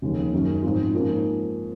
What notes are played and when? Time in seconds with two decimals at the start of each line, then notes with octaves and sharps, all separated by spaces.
0.02 F1 D#2 C#3 G#3
0.33 F#2 D#3 G#3 C#4
0.63 G#2 F3 C4 F4
0.94 G#2 F3 A#3 C#4